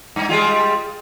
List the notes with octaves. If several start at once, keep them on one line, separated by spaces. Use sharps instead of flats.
G2
G3 G#3 F4